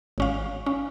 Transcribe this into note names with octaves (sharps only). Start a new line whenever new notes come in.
G#1 C#4 F5
C#4